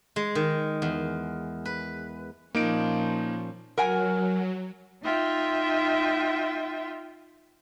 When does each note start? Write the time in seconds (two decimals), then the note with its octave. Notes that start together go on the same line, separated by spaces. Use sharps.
0.16 G#3
0.35 D#3
0.82 E2
1.65 B4
2.55 A#2 F3 A#3 C#4 D#4 D7
3.78 F#3 A#4 F#5 G#5
5.04 D#4 F4 E5 G5